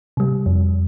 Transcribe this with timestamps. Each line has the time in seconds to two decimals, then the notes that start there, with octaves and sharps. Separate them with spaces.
0.17 C3 G3
0.46 F2